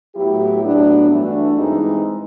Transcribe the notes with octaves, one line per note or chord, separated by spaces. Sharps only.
A2 F#3 B3 E4 G4
A2 F#3 B3 D4
G2 E3 A3 D4 F#4
G2 E3 G#3 C4 D#4